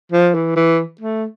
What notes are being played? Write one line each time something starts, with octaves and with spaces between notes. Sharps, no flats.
F3
E3
E3
A3